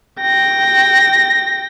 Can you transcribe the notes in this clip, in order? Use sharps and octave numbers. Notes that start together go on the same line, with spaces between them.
G5 A#6